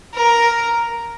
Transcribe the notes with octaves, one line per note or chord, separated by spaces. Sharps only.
A#4